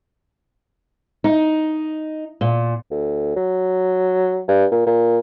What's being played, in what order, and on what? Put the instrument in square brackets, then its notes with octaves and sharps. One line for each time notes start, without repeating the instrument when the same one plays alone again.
[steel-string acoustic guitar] D#4
A#2
[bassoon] D2
F#3
G2
A#2
A#2